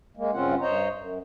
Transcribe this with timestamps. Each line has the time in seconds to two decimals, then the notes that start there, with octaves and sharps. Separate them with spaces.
0.17 G#3 A#3
0.33 G2 C#3 C4 C#4 F4 F#5
0.61 G2 C5 C#5 D#5 A#5
0.95 F#2